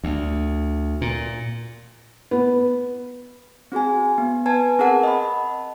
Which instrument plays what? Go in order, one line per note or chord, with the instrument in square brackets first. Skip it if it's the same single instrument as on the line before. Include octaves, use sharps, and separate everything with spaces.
[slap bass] D2
A#2
[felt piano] B3
[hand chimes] C4 F#4 G#4 G#5
B3
B4 G#5 A5 G#6
C4 G#4 A#4 F#5 A5
D#5 B5